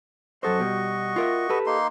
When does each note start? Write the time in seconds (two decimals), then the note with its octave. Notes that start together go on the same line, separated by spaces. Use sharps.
0.43 F#2 F#4 A4 C5 D#5 C#6
0.59 B2 G3
1.16 F4 A#4 E5
1.49 G4 A4 B4
1.66 A#3 D#4 C6